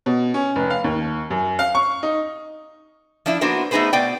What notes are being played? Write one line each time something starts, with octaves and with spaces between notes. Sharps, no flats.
B2
C#4
F1
F5
D#2
F#2
F5
C#6
D#4
F3 D4 E4
A#3 B3 D4 F#4 C5
A3 B3 D#4 G#4 B4 C5
B2 B3 D5 G5